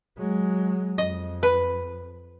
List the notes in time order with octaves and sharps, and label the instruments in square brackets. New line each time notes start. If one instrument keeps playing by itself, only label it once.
[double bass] F#3 G#3
[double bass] F2 [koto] D#5
[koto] B4